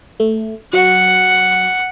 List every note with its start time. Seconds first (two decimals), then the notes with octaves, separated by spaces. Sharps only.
0.20 A3
0.73 F#3 F#5